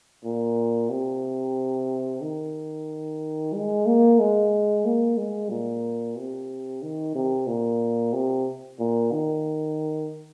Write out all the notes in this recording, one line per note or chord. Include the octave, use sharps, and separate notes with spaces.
A#2
C3
D#3
G#3
A#3
G#3
A#3
G#3
A#2
C3
D#3
C3
A#2
C3
A#2
D#3